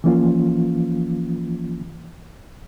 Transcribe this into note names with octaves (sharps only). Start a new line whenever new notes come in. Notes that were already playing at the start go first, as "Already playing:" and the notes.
E3 F3 A#3 C#4 F4